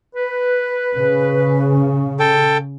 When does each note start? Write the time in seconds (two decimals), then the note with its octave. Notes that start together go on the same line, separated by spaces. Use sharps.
0.16 B4
0.96 C#3
2.20 A4 G5